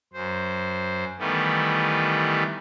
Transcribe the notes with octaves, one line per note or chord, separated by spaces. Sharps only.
F#2 C5
D#3 E3 G3 A3 B3